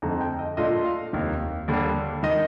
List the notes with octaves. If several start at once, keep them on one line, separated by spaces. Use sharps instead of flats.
F2 D3 A3 D#4 A#5
G5
D#5
A#2 A3 D4 F4 D#5
F5
F1 D#2 D#3
D#2 D3 G3
D#3 D#5